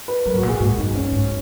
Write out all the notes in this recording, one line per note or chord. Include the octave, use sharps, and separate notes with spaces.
B4
F#3 A#4
G#2 F#4
A#2
G#4
G#2 F#4
F#2 D#4
F#2 C#4
G#2